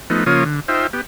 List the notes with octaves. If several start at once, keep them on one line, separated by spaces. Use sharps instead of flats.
F3 A3 B3 D#4
C#3 F3 A#3 F4 C#5 D#6
D3
D#4 F4 C5 E5 G5
B3 G4